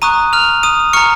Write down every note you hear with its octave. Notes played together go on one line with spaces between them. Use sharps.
A#5 C#6 D#6 F#6 D#7
F6 F7
D#6 D#7
A#5 C#6 F6 C#7